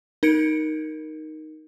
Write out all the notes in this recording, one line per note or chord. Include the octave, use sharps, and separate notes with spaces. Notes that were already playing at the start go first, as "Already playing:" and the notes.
D#4 A#4 G#6 C#7 D7